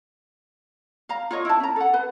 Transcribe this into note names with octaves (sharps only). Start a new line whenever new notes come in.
F5 A#5
F4 C#5 D#5
E4 A5
C#4 A#5
A4 F#5
B4